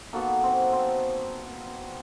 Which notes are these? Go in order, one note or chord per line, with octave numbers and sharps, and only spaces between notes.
A#3 B3 D#4 F#4 A4
C4
C4